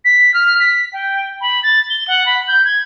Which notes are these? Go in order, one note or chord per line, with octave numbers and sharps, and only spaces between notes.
B6
F6
B6
G5
B5
A6
G7
F#5
B5
G6
G#6